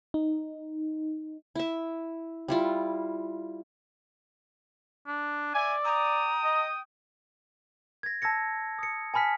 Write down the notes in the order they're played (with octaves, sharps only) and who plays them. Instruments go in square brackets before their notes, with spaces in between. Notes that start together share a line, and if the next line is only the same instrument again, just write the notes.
[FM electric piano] D#4
[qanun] E4 E5
G3 E4 F4
[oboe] D4
[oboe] D5 [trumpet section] E5 G#5
[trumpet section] G5 D#6 [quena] A#5
[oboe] D#5
[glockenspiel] G#6 A#6
A5 E6 G#6 A#6 C#7
D#6 C#7
G#5 A5 B5 F6 B6 C#7